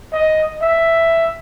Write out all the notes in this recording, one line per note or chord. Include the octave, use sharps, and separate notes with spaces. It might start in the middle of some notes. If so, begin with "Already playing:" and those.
D#5
E5